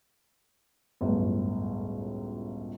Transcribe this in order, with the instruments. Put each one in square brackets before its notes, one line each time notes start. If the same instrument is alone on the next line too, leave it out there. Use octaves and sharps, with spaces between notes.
[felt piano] G1 C#2 F#2 A2